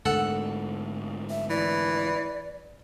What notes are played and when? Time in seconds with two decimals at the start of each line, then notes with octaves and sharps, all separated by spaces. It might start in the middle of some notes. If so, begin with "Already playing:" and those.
0.05 G#2 D3 A3 A4 F#5
1.30 E5
1.50 E3 D5